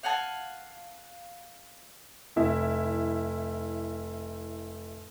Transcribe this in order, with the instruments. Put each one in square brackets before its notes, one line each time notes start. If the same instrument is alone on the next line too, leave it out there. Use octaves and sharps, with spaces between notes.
[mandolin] F5 F#5 G#5 A5
[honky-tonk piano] F1 E4